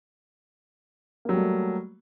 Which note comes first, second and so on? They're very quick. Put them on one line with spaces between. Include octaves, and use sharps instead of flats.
A#3 F#3 G3 A3